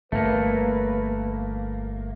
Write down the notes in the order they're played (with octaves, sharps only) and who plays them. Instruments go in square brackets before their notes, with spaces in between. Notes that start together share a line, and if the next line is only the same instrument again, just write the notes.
[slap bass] G1 [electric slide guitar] A3 A#3 [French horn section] B4